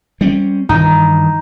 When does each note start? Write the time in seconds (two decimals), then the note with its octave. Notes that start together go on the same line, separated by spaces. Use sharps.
0.21 G3 C4 C#4
0.69 G2 D#3 E3 D#4